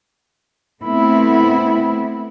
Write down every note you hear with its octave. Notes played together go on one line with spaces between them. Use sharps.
A3 B3 C4 E4